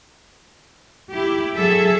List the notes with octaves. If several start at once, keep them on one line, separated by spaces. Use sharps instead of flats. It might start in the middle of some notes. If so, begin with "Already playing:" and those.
E4 G4
F#3 G#4 A4 E5